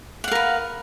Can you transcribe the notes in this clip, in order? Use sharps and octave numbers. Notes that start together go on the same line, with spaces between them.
A#4 B4 F5 F#5